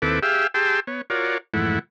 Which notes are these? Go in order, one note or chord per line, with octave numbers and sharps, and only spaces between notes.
D#2 C4 E4 A4 B4 D6
G4 G#4 E5 F5 G5 E6
G4 G#4 G5 A5 C6 E6
B3 C#5
F4 F#4 A#4 C#5 D5
F2 G#2 E3 A3 E4 F#5